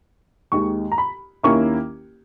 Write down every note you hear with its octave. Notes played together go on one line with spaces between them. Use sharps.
D#2 D#3 G#3 D#4 C#6
A#5
B5
D#2 D#3 A#3 C#4 E4 C#6